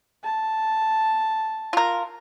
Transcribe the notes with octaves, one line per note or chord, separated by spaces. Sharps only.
A5
F4 A#4